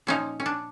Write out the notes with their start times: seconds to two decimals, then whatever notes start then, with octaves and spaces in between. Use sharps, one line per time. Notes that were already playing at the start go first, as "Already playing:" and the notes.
0.07 A#2 F3 A#3 C#4 D#4
0.40 C#4
0.46 D4